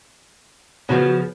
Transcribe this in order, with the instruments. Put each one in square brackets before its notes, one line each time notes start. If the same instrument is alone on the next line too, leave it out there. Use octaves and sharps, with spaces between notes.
[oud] C#3 F3 [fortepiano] B3 [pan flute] F#4